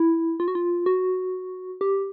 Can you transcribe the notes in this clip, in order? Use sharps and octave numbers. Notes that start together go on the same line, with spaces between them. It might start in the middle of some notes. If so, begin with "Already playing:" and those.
Already playing: E4
F4
F#4
F4
F#4
G4